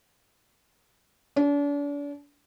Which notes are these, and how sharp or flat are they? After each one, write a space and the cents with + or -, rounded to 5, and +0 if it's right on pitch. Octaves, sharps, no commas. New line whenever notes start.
D4 -40